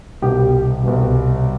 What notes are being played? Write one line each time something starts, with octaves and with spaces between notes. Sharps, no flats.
C2 B2 G3 G4
C2 B2 G3